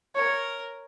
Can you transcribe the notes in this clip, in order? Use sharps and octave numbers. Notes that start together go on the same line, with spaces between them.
A#4 C#5